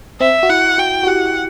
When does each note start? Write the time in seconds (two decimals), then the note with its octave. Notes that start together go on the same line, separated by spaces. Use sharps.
0.20 C4 E5
0.43 F#4
0.49 E4 F#5
0.78 F#4 G5
1.03 F#4
1.07 G4 F#5